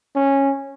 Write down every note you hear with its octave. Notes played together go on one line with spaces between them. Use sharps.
C#4